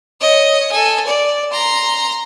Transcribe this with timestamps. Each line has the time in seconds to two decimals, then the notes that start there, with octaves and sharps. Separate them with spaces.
0.21 C#5 D#5
0.72 A4 G#5
1.07 D5
1.52 A#5 C6